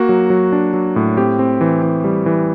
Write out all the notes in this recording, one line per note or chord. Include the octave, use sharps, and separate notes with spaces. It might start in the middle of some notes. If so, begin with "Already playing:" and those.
Already playing: A#3 F#4
F#3
F#3
D4
F#3
A2
C4 G4
C4
E3
E3
G3
E3